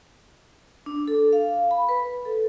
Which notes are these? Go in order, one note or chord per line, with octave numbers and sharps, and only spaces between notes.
D4
A4
F5
B5
B4
A4